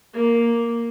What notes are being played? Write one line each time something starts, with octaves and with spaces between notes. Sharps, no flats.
A#3